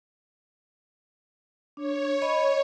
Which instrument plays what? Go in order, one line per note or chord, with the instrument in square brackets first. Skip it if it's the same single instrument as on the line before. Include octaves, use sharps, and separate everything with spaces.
[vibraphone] D4 [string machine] C#5
[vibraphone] D#5 B5